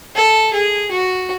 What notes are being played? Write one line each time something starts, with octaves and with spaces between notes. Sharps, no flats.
A4
G#4
F#4